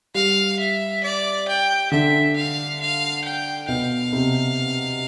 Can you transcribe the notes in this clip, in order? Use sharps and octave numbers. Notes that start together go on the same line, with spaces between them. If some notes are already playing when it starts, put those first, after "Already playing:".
G3 F5
E5
D5
G5
D3 E5
F5
F5
G5
B2 F5
C3